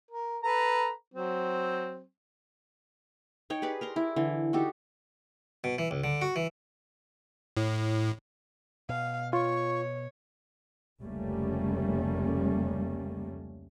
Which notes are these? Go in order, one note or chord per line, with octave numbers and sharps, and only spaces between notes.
A#4
A4 B4 A#5
F#3 C4
D#4 C#5 G5
G4 G#4 B4 D5
A#4 A#5 C6
E4
D3 E3
D#4 F#4 G4 A4
B2
E3
C#2
D3
F#4
E3
A2
B2 F5
F4 C#5 C#6
F1 C#2 G3 A3 A#3 C#4